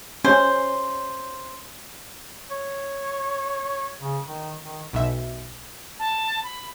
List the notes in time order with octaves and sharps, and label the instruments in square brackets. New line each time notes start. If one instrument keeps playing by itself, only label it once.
[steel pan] C#4 [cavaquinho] C5
[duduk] C#5
C#3
D#3
D#3
[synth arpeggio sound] B1 B2 E5
[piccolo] A5
B5